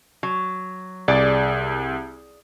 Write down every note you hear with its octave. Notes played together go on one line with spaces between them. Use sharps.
F#3
C2 G#4 D5